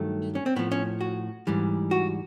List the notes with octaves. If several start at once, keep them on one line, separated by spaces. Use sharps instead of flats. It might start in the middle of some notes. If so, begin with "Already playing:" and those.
Already playing: G2 D#3 F#3 A3
C#4
C4
A2 F3 B3
C#4
F#4
G#2 E3 G3
F#4